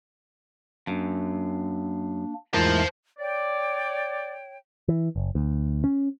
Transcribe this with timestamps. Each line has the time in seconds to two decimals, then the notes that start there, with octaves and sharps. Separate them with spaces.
0.87 F#2 A#3 D4
2.54 E2 G#2 A3 E4 F4 A#4 C5 A5
3.18 C#5 D5 G5
4.88 E3
5.16 F#1
5.35 D2
5.84 C#4